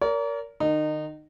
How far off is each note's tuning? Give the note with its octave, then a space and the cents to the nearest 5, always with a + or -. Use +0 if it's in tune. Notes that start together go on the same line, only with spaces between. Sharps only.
A#4 +0 D5 -45
D#3 -35 D#4 -25